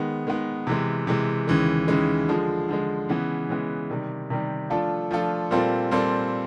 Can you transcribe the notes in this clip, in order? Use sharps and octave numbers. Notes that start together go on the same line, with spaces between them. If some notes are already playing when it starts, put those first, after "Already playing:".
Already playing: D#3 G#3 B3
D#3 G#3 B3
C3 E3 G#3
C3 E3 G#3
D#2 C#3 E3 G#3
D#2 C#3 E3 G#3
D3 F3 G#3
D3 F3 G#3
C#3 E3 G#3 B3
C#3 E3 G#3 B3
C3 D#3 G3
C3 D#3 G3
F3 A3 D4 F4 A4
F3 A3 D4 F4 A4
A#2 G3 C4 F4 A4
A#2 G3 C4 F4 A4